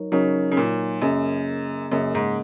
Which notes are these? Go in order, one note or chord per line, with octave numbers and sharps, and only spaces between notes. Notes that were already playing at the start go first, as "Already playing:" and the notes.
Already playing: F#3 D#4 A#4 C#5
C#3 F#3 D#4 A#4 C#5
C#3
A#2
F#2 C#3 A#3 C#4 G#4 D#5
F#2 C#3 A#3 C#4 G#4 D#5
G#2